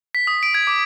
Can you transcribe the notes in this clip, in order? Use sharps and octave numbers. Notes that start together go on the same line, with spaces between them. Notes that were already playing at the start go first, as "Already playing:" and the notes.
B6
D#6
D7
G#6
D6